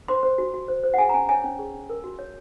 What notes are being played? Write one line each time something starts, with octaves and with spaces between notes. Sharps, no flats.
C5 C6
C5
F#4
F#4
C5
C5
F#5
G#4 G#5
A#5
C#4 G#5
C#5 G#5
C#4
G#4
C#4
A#4
F#4
C#5